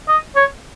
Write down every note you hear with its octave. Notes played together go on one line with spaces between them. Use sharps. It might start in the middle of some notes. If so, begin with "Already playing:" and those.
D#5
C#5